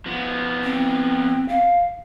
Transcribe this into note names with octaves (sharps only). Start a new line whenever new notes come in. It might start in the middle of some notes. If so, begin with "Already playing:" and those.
F3 B3
C4
F5